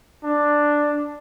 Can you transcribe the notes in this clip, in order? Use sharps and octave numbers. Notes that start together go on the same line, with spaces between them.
D4